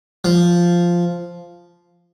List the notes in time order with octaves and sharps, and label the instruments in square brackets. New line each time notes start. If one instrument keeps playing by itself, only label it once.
[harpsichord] F3